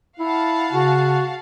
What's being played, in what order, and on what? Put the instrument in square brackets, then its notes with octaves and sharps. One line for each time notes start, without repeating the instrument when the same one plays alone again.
[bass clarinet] E4 [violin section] F5 F#5 A5
[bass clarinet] C#3 [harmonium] F#4